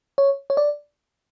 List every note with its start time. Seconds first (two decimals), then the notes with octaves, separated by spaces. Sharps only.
0.18 C#5
0.50 C#5
0.57 D5